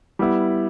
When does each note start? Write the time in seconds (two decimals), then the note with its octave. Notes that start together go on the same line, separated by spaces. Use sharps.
0.19 G3 B3 E4